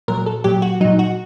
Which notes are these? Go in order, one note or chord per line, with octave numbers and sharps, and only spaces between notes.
A#2 F#3 A#4
A4
A#2 F#3 G4
F#4
A#2 F#3 D#4
F#4